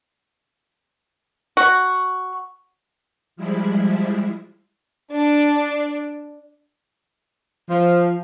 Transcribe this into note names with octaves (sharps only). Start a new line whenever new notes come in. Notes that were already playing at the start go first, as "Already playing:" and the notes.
F#4
F3 G3 G#3 E4
D4
F3